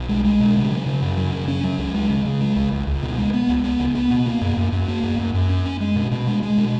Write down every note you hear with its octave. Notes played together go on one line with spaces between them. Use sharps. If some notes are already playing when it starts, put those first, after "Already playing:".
Already playing: B1
G#3
G#3
B2
C#3
F#3
C#3
F#2
F#3
C#3
C#4
F#3
C#2
G#3
C#3
C#3
G#3
C#2
C#2
C#2
B2
G#3
B3
C#2
B3
C#2
B3
B2
A#3
F#2
F#2
F#2
A#3
F#2
F#2
F#2
C#4
C#4
G#3
B2
B2
G#3
G#3
B2